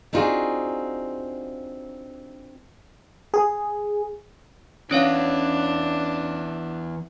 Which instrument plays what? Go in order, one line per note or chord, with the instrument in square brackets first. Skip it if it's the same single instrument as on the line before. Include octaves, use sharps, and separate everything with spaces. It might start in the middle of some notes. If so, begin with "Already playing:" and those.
[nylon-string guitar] C4 D4 D#4 F4 F#4 G#4
[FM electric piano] G#4
[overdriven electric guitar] E3 B3 [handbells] C#4 C#5 F5 [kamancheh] D4